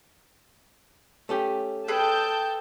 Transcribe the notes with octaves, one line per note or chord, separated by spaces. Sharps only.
A3 C#4 G4
G#4 A4 B4 G5 A5 G6